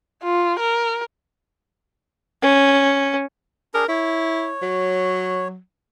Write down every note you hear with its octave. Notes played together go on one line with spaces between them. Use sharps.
F4
A#4
C#4
D4 G#4 A#4
E4 C#5
F#3